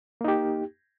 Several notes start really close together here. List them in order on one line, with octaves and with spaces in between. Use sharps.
A#3 D#4 G4